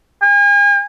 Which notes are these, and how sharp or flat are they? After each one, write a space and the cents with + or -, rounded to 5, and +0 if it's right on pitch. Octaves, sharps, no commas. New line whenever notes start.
G#5 -40